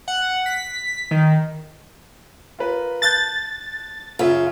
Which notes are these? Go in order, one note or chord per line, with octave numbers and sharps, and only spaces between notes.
F#5
B6
D#3
F4 A#4 B4
A5 F#6 G6 A6
F#2 C#3 F4 E5